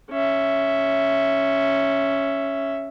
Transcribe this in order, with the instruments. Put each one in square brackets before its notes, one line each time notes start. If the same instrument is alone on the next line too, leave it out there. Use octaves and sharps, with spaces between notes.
[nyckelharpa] C#4 E5